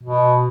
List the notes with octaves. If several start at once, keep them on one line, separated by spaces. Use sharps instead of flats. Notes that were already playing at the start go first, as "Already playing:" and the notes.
B2